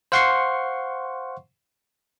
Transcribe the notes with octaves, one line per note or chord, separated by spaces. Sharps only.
C5 F5 F#5 C6 C#6 C7